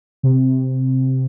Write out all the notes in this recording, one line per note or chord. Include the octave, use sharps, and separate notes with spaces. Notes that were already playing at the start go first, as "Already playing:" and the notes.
C3